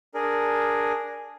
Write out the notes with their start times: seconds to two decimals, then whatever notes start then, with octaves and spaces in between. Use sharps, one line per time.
0.14 D4 G#4 A#4